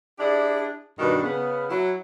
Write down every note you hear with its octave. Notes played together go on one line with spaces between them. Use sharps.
D4 E4 G4 G#4 D5
G2 B2 D#3 D4 F#4
C#3 B3
F#3 E4